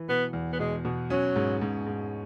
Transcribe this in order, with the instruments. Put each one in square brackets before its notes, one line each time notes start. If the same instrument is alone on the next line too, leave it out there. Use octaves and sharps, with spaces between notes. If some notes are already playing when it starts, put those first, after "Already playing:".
Already playing: [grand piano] E3
[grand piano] B2 [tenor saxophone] B3
[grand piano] E2
[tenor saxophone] B3
[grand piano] B2 [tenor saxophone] G#3
[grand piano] B2
[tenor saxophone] F#3 [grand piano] C#4
[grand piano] G#2
G#2
G#2